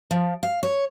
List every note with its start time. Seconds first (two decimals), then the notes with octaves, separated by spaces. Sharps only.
0.11 F3
0.43 F5
0.63 C#5